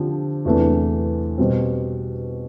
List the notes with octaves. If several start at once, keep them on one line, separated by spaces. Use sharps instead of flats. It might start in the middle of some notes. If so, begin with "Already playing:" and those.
Already playing: D3 F3 C4 G4
E2 C3 E3 A3 D4
B2 G3 C4